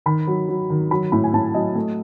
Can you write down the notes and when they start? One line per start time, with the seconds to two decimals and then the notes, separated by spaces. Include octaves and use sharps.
0.06 D#3 B5
0.27 F#3
0.48 F#3
0.70 D#3
0.91 F#3 B5
1.12 A2 B5
1.24 G#5
1.33 A2 A5
1.55 F#3 D#5
1.75 A3